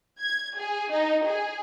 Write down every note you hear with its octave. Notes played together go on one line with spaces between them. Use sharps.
G#6
G#4
D#4
G#4